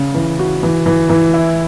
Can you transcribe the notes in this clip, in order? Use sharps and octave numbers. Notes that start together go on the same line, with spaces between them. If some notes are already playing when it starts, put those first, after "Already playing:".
Already playing: C#3
E3
F#4
E3
E3
E3
E4